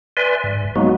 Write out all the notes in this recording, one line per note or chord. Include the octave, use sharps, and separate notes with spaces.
B4 D5 E5 G#5 C6
G#2
F#3 G#3 A#3 B3 D#4 F#4